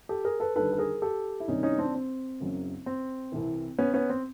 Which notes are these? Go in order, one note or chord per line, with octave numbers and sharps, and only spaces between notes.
G4 A4
G#4 A#4
A4 B4
D#2 D3 G3 A4 B4
A4
G#4 A#4
G4 A4
E4
C2 C3 D#3 G3 C#4 D#4
C#4 D#4
C4 D4
C4
F#1 F#2 C#3 F#3
C4
C2 C3 E3
B3 C#4
B3 C#4
C4